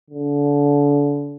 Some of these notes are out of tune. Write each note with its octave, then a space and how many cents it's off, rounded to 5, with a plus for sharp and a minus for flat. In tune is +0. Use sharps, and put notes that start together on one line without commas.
D3 -30